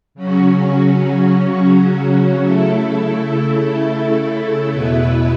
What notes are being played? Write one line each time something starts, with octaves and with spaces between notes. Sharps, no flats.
C#3 F#3 C#4 F#4
C#3 A3 E4 A4
E2 B2 B3 E4 B4